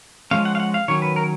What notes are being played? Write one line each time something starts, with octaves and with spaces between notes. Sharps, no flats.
F3 G#3 C#4 F5
F#5
F5
F#5
F5
D#3 F#3 C#4 C#5
B4
A#4